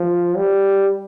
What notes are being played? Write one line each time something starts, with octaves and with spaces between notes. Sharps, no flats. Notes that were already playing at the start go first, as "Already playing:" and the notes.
Already playing: F3
G3